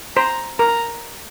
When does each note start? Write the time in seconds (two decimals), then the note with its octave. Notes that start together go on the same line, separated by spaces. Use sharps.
0.16 C5 A#5
0.59 A#4 A#5